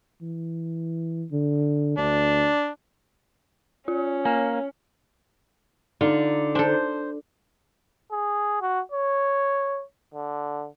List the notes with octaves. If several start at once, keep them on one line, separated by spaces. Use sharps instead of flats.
E3
D3
D2 D4
C#4 F4
A#3 G#5
D3 D#4 F4
D4 A4 C5
G#4
F#4
C#5
D3